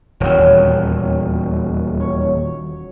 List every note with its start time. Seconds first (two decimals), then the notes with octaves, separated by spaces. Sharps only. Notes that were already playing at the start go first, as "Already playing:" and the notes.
0.20 D#1 E2 F#3 C#4 G5
2.01 C#5